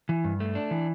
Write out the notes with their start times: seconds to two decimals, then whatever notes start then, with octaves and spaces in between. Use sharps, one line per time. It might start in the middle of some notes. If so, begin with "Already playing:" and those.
0.09 E3
0.24 G2
0.40 A3
0.55 D4
0.71 E3